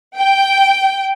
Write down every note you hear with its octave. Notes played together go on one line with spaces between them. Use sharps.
G5